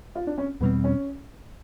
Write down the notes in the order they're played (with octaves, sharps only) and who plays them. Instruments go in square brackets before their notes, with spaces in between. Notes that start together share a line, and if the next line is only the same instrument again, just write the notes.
[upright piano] F4
D4
C#4
[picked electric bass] E2 B2 G3 C4 [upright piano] B3
[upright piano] C#4